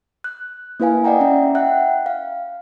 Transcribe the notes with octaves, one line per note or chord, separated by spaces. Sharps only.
F#6
A#3 E4 B4 F5 G#5
D5 D#5 F#5 G5 A#5
C#4 E5 A#5
E5 F#5 G5 F#6
F5